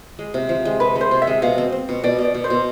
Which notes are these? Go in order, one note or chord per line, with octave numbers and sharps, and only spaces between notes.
G#3
C3
F3
G#3
C3 B4
G#3
C5
C3
E5
G#3
B2 F5
C4
C4
B2
B2 D5
B2
D5
B2
C5
B2